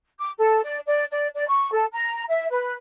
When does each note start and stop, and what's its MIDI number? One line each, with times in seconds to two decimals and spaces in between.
0.19 0.31 86
0.38 0.61 69
0.64 0.79 74
0.87 1.04 74
1.12 1.28 74
1.35 1.47 74
1.48 1.70 85
1.72 1.85 69
1.93 2.24 82
2.29 2.47 76
2.51 2.74 71